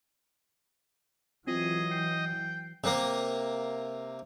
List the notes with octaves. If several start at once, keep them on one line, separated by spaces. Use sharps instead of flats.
E3 F#3 C4 F4 G#4 D#5 D#7
G5 C7
C3 A#3